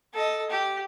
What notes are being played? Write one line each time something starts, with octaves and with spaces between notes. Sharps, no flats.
A4 D#5
G4